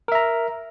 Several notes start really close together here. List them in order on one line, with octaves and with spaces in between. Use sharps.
A#4 E5 A#5